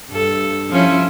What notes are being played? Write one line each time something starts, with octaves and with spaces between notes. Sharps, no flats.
G2 A4
F3 C#4 E4